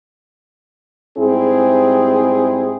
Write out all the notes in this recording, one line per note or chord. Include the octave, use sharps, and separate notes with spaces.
G#2 G3 C4 E4 G#4